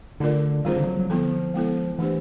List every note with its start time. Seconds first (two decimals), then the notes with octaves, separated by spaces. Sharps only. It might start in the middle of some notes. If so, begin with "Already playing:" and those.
0.20 D3 A3 D4 F4 A#4 D5
0.65 D#3 G3 C4 F4 G#4 C5
0.76 D3
0.87 F#3
0.99 F#3
1.10 D3 F3 G3 B3 E4 A4
1.54 G#3 B3 E4 A4
1.98 E3 A3 D4 G4 C5